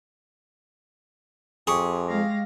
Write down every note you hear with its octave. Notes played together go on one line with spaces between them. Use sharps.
F2 G4 G#4 C6 C#6
G#3 F5 A#6